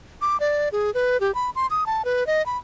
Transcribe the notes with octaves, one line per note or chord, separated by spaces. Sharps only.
D6
D5
G#4
B4
G4
B5
C6
D#6
A5
B4
D#5
B5